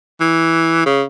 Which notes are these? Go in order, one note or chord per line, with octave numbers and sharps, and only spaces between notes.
E3
C#3